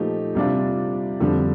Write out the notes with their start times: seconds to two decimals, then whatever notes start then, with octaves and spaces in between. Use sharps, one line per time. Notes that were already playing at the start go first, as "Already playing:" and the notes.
Already playing: A#2 F3 A3 D#4 G4
0.35 C3 G3 D4 F4
1.20 F2 D3 G3